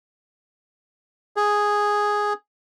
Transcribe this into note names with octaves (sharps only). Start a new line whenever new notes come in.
G#4